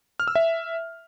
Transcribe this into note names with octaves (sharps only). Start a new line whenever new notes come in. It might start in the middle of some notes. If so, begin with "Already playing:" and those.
F6
E6
E5